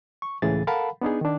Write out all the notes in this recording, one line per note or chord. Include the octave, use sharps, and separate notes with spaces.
C#6
C#2 A2 C#3 E3 G#4 A6
A4 A#4 F5 F#5 A5 B5
B3 D4 D#4 G#4
D#3 D4